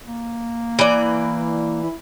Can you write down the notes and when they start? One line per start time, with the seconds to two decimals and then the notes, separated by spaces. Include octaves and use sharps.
0.07 A#3
0.79 E3 D5
1.83 E4